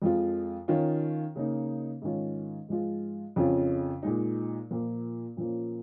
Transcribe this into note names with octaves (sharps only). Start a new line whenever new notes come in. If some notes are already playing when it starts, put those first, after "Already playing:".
F2 F3 G#3 F4
D#3 C#4 F4
C#3 A#3 D#4
G#2 D#3 C#4 F4
G#2 F3 G#3 F4
F2 C#3 F3 C#4 F4
A#2 G#3 D#4
A#2 F3 A#3
A#2 F3 A#3 C#4